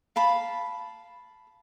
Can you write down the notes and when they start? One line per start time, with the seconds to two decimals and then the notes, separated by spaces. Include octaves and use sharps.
0.16 F5 A5 B5